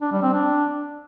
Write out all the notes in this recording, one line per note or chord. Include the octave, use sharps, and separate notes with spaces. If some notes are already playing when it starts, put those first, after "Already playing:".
D4
G3
C4
D4